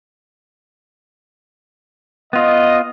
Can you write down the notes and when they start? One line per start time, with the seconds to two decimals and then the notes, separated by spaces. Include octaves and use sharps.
2.33 B3 F4 D#5